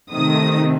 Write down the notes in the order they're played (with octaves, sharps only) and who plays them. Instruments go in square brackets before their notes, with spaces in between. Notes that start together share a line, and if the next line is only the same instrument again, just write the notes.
[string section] C3 D#3 A3 C4 D#6